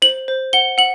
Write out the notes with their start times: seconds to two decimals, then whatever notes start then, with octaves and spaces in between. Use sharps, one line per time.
0.02 C5 F#7
0.28 C5
0.53 F#5 G7
0.78 F#5 F#7